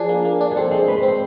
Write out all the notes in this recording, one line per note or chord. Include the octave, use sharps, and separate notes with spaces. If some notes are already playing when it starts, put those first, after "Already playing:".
Already playing: F3 D4 G#4
A#3
A#3
D4
G#4
C4 A4
G#3 C5
G#3 B4
C5
C4
C5